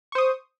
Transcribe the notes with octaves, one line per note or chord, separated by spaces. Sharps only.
C5 C#6 D#6